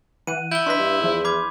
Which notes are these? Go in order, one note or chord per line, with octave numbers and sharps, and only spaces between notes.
E3 F#5 F#6 D#7
E4 G6 G7
D4 B4 D#5 C6 B6
G2
E2 F3 E5
B5 C6 D6 F6 G#6